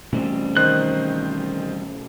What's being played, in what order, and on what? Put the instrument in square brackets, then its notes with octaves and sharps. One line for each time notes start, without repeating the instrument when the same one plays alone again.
[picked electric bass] B2 A3 C#4 [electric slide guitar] E3 G3 C4
[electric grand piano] D#3 C5 D#5 [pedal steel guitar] F#6